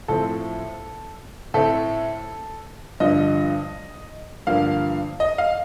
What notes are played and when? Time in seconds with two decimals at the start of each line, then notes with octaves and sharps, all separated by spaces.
0.08 A2 F3 C4 A4
1.54 A2 A3 C4 A4
3.00 G2 D3 F3 D#5
4.47 G2 D3 F3 A#3 F5
5.20 D#5
5.38 F5